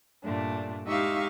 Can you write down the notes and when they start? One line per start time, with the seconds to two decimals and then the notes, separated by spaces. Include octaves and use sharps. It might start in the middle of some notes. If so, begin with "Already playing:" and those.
0.23 G2 A#2 A3 D4
0.88 G#3 D#4 G4 E5 F5 C#6